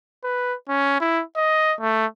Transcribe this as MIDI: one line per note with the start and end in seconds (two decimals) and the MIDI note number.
0.24 0.55 71
0.69 0.99 61
1.00 1.22 64
1.36 1.74 75
1.80 2.06 57